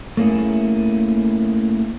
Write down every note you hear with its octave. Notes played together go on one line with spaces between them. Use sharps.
A3 A#3 C#4 E4 G#4